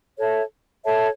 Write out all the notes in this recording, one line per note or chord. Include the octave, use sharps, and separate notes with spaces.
A4 C#5 E5 A5
A4 C#5 E5 A5